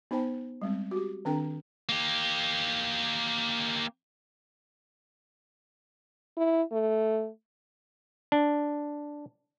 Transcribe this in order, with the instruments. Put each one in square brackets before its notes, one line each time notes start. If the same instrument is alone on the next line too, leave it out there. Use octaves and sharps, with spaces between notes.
[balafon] B3 D#4 C5 G5 A5
G3 G#3 C4
F#4 G4
D#3 C4 D4 A4 G5 A#5
[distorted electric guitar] A#3 G4
[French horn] E4
A3
[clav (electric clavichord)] D4